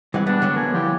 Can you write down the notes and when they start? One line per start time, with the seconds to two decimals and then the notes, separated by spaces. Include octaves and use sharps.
0.14 E3 G3 G#3 C4 F#5
0.27 B3 D4
0.42 D3 F#3 B3
0.57 A#3 G#5
0.73 F3 G3 E4 G4